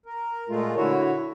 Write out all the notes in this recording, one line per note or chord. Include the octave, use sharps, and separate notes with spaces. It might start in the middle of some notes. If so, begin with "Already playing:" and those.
A#4
A#2 G#3 A3 F4
D3 E4 F#4 C#5